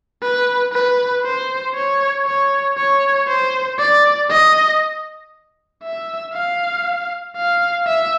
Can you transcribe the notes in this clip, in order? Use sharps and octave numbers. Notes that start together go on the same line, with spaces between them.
B4
B4
C5
C#5
C#5
C#5
C5
D5
D#5
E5
F5
F5
E5